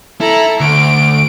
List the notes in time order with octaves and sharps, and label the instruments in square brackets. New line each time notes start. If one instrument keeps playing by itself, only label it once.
[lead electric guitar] E4 [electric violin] A4 A#5
[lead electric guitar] D2 [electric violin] D7